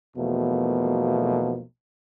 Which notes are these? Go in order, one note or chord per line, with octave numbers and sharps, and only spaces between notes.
B1 E2 B2 F3 A3 A#3